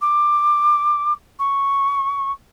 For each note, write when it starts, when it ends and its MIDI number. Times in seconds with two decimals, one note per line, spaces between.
0.01 1.13 86
1.39 2.32 85